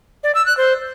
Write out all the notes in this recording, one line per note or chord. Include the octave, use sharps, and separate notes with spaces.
D5
E6
F#6
C5